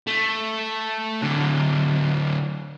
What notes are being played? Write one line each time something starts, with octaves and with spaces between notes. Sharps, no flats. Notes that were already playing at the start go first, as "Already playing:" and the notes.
A3
D3 F#3